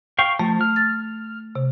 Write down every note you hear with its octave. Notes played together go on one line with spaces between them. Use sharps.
F5 G5 C#6
F3 A3
F6
A6
C3